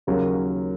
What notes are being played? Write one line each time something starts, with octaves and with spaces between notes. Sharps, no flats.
D#2 C#3 F#3 A#3 C#4